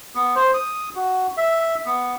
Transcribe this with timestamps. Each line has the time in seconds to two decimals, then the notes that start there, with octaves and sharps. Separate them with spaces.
0.15 B3
0.36 C5
0.54 D#6
0.95 F#4
1.37 E5
1.86 B3